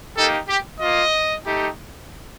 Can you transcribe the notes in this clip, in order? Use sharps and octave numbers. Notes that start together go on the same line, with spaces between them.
A#3 D#4 G4 A4
G4
A#3 F4 D#5
A3 D#4 G4